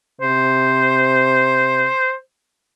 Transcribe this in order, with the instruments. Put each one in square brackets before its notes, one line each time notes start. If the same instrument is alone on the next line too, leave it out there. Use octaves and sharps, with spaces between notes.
[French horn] C3 [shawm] C5